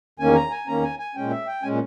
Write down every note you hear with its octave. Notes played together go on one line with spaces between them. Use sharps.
E2 D#3 A#3 C#4 G#5
A#5
G#5
E2 D#3 A#3 C#4 A#5
G#5
G#5
A#2 G#3 C#4 G5
E5
G5
A#2 G#3 C#4 G#5